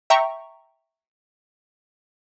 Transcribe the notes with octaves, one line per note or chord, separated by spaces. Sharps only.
E5 G5 A#5 C#6